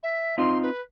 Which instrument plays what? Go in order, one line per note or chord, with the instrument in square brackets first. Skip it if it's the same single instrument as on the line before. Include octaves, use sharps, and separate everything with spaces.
[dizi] E5
[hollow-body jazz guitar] C4 D#4 F4 [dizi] C6
[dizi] B4